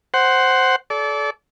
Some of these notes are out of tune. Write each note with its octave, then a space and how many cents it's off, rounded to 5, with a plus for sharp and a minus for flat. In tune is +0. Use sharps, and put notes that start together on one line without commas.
C5 +0 F#5 +15
A4 -30 D5 -25